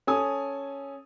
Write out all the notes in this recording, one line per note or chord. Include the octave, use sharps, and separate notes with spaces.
C#4 A4 G#5 D#6